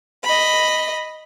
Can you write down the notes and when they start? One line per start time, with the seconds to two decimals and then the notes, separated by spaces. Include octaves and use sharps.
0.24 D#5 B5